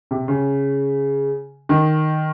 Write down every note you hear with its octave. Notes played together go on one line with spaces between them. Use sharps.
C3
C#3
D#3